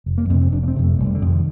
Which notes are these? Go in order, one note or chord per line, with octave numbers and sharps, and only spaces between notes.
F1
A#3
F2 C3 C4
C4
F1 D4
A#3
C4
F2 C3
A3
F1 G3
D3
F2 C3
D#3